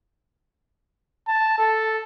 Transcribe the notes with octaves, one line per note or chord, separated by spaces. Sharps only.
A5
A4